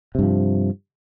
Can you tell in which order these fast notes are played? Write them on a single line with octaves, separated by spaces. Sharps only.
C3 G2 F3